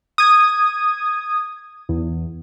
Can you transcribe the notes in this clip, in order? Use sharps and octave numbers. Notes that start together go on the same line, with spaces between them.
D#6 G#6
E2